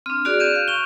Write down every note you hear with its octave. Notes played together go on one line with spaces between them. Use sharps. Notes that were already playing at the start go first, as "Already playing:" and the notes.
C4 D4 F6
F#4 G#4 D5 F#6 D7 F7
G6 D#7 E7
F5
C#6 F7 G7